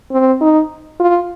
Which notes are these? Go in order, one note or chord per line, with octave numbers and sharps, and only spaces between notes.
C4
D#4
F4